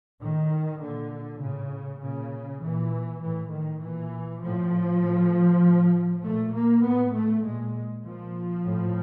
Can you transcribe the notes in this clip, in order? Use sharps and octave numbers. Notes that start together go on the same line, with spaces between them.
A2 D#3
A#2 D3
A2 C#3
A#2 C#3
A#2 E3
A2 E3
D#3
A#2 E3
A2 F3
A2
A2
A#2 A3
A#3
A2 B3
A3
A#2 G#3
A#2 F3
A2